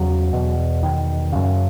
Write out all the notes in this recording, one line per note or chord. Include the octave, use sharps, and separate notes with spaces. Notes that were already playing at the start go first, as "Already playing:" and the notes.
Already playing: E2 C#3 F#3
E2 B2
D#3
F#2 C#3